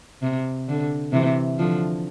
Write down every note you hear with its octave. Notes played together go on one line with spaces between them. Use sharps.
C3
D3
C3 E3
D3 F3